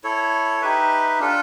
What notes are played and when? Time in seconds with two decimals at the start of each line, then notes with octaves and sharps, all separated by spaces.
0.04 E4 A4 C#5
0.62 D#4 G4 B4 E5
1.19 D4 F4 A4